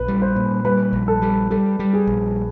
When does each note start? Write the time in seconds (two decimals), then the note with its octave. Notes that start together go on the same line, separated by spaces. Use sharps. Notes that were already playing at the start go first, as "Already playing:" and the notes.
Already playing: A#1 B4
0.08 G3
0.22 C5
0.36 A#2
0.65 G3 B4
0.93 A#1
1.08 A4
1.22 G3
1.51 G3 A4
1.79 G3
1.93 G#4
2.07 A#1